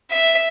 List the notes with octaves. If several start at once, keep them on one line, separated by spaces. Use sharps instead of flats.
E5